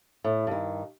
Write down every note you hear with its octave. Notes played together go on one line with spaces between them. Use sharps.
A2
G2 D#3